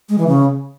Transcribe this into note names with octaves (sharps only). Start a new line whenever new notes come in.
G#3
E3
C#3